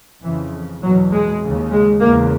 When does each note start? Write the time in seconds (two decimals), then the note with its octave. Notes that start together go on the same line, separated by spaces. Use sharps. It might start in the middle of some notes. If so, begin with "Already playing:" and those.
0.23 F2 C#3 E3
0.82 E2 B2 F#3
1.12 G#3
1.41 D#2 C#3
1.72 G#3
2.01 E2 C#3 A#3